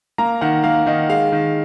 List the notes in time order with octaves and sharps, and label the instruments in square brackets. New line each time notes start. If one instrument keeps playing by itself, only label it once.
[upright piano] A#3 A#5
D#3 F#5
A#3 F5
D#3 D#5
G#3 F5
D#3